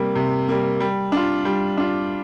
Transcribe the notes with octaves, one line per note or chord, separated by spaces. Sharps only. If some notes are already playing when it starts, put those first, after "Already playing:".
Already playing: C3 G3 A#3
C3
G3 A#3
G3
D4 F4
G3
D4 F4